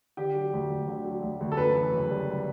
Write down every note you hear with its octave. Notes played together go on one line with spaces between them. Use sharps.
D3 G4
F#3
D2
D2
D3
F#3
D2
D2
A4
F#2 B4
E3
F#1
G3